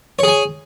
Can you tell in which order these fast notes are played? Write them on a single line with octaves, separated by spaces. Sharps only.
C#5 G#4 G#5